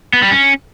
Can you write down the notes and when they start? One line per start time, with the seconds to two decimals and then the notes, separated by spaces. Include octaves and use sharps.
0.13 B3
0.22 G3
0.31 C#4